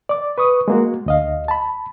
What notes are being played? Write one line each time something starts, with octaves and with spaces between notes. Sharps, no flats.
D5 D6
B4 C#6 D#6
G#3 A#3 F#4
D2 D#5 F5
A5 B5